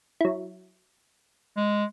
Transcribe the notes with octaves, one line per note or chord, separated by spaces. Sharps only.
F#3 E4
G#3